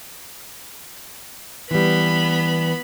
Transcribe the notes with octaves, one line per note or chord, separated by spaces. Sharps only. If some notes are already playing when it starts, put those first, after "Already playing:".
E3 G3 B3 B5